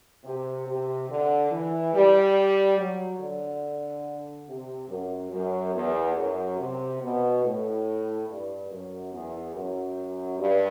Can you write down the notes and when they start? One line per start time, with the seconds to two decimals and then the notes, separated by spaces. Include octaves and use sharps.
0.24 C3
0.66 C3
1.09 D3
1.51 E3
1.93 G3
2.78 F#3
3.20 D3
4.47 C3
4.89 F#2
5.31 F#2
5.74 E2
6.16 F#2
6.58 C3
7.01 B2
7.43 A2
8.27 G2
8.70 F#2
9.12 E2
9.54 F#2
10.39 G2